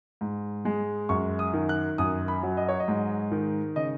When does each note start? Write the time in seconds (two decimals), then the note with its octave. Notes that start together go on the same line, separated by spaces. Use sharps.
0.21 G#2
0.65 G#3
1.09 F#2 C#6
1.39 D#6
1.54 D#3
1.69 F#6
1.98 F#2 D#6
2.28 B5
2.43 F#3
2.57 D#5
2.68 C#5
2.80 D#5
2.88 G#2
3.32 D#3
3.76 C#3 D#5